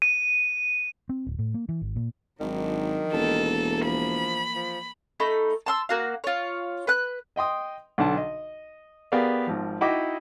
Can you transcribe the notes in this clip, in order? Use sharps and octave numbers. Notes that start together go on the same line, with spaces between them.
D#7
C4
D1
A2
A#3
E3
G#1
A#2
G#1 D#3 F#3 D4
E1 E3 A#3 A4
F3 B5
F3
A3 D#4 B5
A5 C6 E6
A#3 F#4 F5
F4 C#5
B4 F#6
D#5 G5 C6 D#6
B1 D3 D4 F#5 A5
D#5
B3 G4 G#4 A#4 D5 F5
G#1 F3
D#4 E4 F#4 D#5 G5 D6